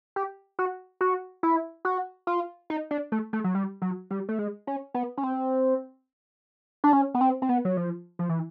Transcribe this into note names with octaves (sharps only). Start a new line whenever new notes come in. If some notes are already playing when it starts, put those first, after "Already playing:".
G4
F#4
F#4
E4
F#4
F4
D#4
D4
A3
A3
F#3
G3
F#3
G3
A3
G#3
C#4
B3
C#4
C4
D4
C#4
B3
C4
C4
B3
F#3
F3
F3
E3